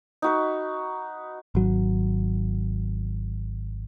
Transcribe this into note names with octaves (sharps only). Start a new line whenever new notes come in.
D#4 F#4 B4
G#1 F#3